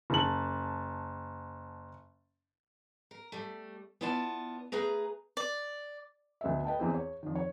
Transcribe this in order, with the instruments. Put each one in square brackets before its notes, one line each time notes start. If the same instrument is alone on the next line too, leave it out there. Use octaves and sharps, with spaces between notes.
[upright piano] F#1 A5 F#7
[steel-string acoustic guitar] A#4
G3 A3
B3 E4 F4 D5 A5
A3 G#4 B4 A#5
[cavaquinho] D5
[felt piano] D2 B3 D#5 E5
B4 D#5 G5 A5
E2 E3 C4
C#5
F2 D#3
C#5